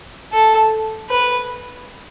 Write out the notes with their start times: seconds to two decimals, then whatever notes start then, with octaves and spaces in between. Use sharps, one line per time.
0.33 A4
1.09 B4